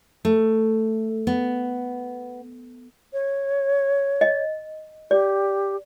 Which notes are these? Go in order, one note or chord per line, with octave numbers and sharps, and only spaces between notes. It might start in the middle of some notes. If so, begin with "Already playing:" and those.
A3
B3
C#5
D#5
G4 D5